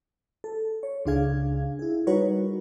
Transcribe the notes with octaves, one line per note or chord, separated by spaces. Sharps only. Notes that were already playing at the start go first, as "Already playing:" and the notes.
A4
C#5
C#2 C#3 D4 G#4 F5 G#6
E4 G#4
G3 D#4 F#4 A#4 B4 C#5